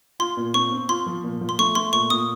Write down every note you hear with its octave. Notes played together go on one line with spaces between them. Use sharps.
F4 C6
A#2
C4 C#6
C4
F4 C6
F3
A#2
F3
C6
A3 C#6
A3 C6
A#2 C#6
A#2 D#6